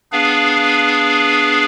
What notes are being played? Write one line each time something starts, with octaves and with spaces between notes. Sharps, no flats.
B3 D4 G#4 B4 F5